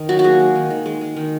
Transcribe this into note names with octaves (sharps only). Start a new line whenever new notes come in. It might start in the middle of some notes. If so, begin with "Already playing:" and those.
Already playing: D#3 D#4
F#3 F#4
F#4
A#3 G#4
G#3
D#3
D#3
G#3
G#3
D#3